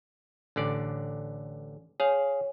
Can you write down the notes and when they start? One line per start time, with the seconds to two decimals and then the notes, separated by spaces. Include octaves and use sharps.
0.56 A1 D3 D5
2.00 G#4 C#5 F5